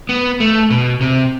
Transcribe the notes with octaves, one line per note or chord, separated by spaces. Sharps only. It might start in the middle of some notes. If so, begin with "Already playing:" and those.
B3
A3
B2
C3